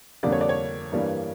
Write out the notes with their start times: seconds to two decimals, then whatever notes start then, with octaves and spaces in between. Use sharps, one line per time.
0.23 F2 D3 G3 A#3 D5
0.32 C#5
0.41 D5
0.49 C#5
0.92 G2 E3 G3 A#3